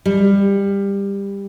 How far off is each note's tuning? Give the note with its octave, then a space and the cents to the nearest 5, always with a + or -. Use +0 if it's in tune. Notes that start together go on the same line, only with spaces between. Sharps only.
G3 +20